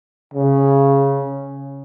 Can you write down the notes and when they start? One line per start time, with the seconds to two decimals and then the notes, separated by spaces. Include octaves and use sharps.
0.34 C#3